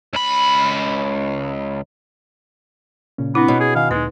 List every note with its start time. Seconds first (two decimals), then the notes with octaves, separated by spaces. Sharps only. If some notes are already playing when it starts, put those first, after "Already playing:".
0.13 C#2 B5
3.18 A#2 C#3 C#4
3.35 B3 C4 D4 E4
3.48 B2 C#5 D#5
3.60 G#4
3.75 D#3 D#5 F5 G#5
3.91 D2 A#2 G#3 D#4 B4